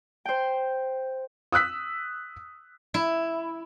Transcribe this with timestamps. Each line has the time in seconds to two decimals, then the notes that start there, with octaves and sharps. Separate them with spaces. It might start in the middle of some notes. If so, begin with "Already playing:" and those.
0.25 C5 G5
1.52 D#6 E6 F#6 B6
2.94 E4